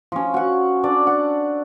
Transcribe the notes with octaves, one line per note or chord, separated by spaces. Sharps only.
F3 C#4
F#4 F#5
D4 A4 D5
F#5